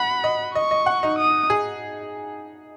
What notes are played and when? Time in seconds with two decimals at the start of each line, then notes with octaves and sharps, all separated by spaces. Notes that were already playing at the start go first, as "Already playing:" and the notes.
Already playing: F#5 B5
0.24 D#5
0.55 D#5 C#6
0.71 D#5
0.86 F#5
1.03 D#4
1.19 D#6
1.50 G#4